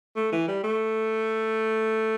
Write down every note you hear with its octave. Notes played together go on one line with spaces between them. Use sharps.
A3
E3
G3
A3